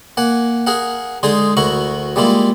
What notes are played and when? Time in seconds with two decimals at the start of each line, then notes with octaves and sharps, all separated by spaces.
0.17 A#3 F#5 G#5
0.67 G#4 A#4 F5 F#5
1.23 D3 G#3 D#4 G#4 C6 D#6
1.57 D2 E4 F#4 A#4 C#6
2.16 G3 G#3 A#3 E4 F4